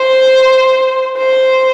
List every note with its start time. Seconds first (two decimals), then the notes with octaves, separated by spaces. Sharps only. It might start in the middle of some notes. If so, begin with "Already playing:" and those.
Already playing: C5
1.18 C5